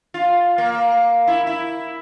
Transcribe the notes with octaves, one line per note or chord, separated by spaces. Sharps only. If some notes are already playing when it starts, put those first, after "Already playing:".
F4
A#3
E4
E4